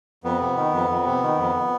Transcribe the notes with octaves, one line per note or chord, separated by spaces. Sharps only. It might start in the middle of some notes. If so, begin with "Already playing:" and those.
F2 B3
C3
D#3
F2
F2
C3
D#3
F2